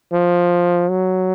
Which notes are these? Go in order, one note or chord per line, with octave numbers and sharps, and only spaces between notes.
F3
F#3